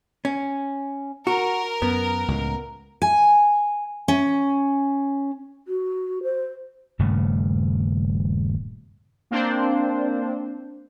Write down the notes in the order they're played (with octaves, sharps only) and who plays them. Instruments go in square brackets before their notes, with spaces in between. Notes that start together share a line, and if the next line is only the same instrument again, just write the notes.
[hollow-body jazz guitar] C#4
[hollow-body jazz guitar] F#4 [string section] A#4
[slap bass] F#2 [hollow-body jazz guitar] B3
[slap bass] C#2 A2
[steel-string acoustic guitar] G#5
C#4
[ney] F#4
C5
[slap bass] D#1 G2 C#3 A3
[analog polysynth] A#3 C4 D4 C5